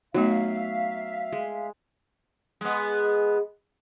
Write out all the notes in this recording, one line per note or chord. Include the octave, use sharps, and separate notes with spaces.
F#3 A3 B3 D#4 E5 F5
G#3
G#3 B3